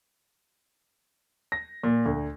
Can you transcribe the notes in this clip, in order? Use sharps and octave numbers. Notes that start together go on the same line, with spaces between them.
A#6
A#2
D2